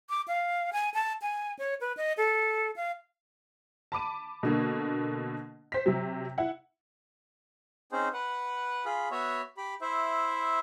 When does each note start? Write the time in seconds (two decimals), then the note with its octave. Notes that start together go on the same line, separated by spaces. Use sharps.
0.10 D6
0.28 F5
0.73 G#5
0.94 A5
1.22 G#5
1.59 C#5
1.81 B4
1.97 D#5
2.17 A4
2.76 F5
3.92 A5 B5 D6 D#7
4.43 B2 D3 A#3
5.72 C5 B6
5.86 C3 F#3
6.38 E4 F#5
7.92 C4 C#4 D#4 G#4 C5
8.14 B4 F#5
8.85 F4 G#4 B5
9.11 B3 F#4 C#5 E5
9.57 G4 B5
9.81 E4 C5 E5